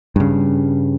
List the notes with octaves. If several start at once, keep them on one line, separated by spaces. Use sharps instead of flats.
G2 C#3